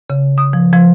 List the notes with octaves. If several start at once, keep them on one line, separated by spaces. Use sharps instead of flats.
C#3
D#6
F3
F3